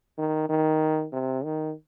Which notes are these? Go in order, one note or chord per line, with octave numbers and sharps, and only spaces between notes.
D#3
D#3
C3
D#3